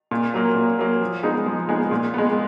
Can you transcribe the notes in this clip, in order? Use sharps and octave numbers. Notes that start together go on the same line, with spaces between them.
A#2
F#3 A#3
A#2
F#3 A#3
F3
G#3 B3 D#4 G#4
F3
G#3 B3 D#4 G#4
A#2
G#3 B3